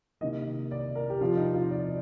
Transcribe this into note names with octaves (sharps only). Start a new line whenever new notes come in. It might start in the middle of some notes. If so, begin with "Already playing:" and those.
C3 D#3 A#3 D#5
D5
A#4
G4
C3 F3 C4 F4
D#4
F4
D5